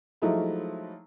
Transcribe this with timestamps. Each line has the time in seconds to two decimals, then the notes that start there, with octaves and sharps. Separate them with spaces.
0.22 F3 F#3 G#3 A3 D#4 E4